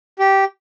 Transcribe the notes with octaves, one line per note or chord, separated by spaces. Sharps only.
G4